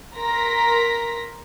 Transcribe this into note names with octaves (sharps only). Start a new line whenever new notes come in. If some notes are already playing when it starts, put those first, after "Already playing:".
A#4 A#5 C6 A#6 B6